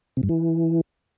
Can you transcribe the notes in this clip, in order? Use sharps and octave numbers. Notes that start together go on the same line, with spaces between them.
C3
G2
E3